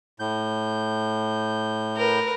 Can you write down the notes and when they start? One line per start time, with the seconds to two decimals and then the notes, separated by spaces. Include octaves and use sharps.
0.20 A2 G6
1.95 A#4 B4